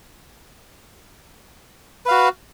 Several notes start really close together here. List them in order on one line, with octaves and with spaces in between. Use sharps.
B4 F5 F#4